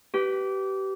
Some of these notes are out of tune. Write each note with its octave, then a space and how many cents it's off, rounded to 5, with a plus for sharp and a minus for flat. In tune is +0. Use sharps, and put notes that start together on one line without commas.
G4 -25 B4 +5